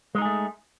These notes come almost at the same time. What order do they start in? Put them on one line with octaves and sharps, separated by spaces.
G#3 D#4 G#4 A3